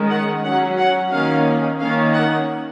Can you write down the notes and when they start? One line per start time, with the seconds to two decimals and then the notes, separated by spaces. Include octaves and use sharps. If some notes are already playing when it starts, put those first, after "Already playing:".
Already playing: D#3 G#3 C#4
0.10 F#5
0.44 F#3 C#4 F#5
0.78 F#5
1.12 D#3 A#3 C#4 F5
1.79 D#3 A#3 C#4 F5
2.14 F#5